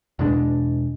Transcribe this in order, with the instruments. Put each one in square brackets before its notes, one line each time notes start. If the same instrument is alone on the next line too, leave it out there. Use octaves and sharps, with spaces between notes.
[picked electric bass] E2 B2 G#3 D4